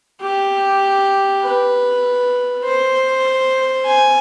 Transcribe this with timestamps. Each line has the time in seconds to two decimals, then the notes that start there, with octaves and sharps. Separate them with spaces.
0.21 G4
1.42 B4
2.64 C5
3.86 G#5